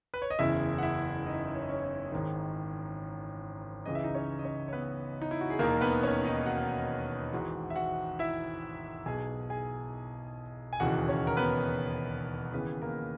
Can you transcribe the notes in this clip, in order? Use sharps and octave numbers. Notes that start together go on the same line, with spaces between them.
B4
C#5
D#5
F#1 E2 C#3 E4 E5
F#5
E4 E5
D#4 D#5
C#5
D#5
C#4 C#5
C#4 C#5
G#1 G#2 D#3
C#2 C#3 E3 D#5
E5
D#4 D#5
C#4 C#5
D#5
C#4 C#5
C#5
B3 B4
D#4
E4
F#4
G#4
E1 D#2 D#3 A#3 A#4
B3 B4
C#4 C#5
D#4 D#5
F#4 F#5
G#1 G#2 E3 F#4 F#5
E5
F#4 F#5
E4 E5
B1 B2 G#4 G#5
G#4 G#5
G#5
E1 D#2 C#3 E3 F#4 F#5
C#4 C#5
A#4
B3 B4
D#2 C#3 E3 B3 B4
A#3 A#4